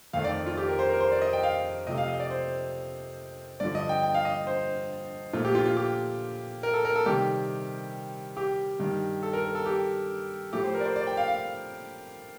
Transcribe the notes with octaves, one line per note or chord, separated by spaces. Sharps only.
F2 D#3 A3 F5
D5
F4
G4
A#4
C5
A#4
C5
D5
D#5
G5
F5
C3 F3 A3 D#5
F5
D#5
D5
C5
G2 D3 F3 D5
D#5
G5
G5
F5
D#5
C5
A#2 F3 A3 F4
G4
F4
F4
G4
A#4
A4
A#4
A4
C3 D#3 G3 G4
G4
G2 D#3 G3
A4
A#4
A#4
A4
G4
A2 F3 A3 G4
C5
A#4
D5
C5
D5
G5
F5
F5